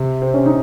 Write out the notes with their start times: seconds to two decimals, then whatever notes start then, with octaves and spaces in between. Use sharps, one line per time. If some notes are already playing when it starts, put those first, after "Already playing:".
Already playing: C3
0.22 C4
0.34 C#4
0.46 D#4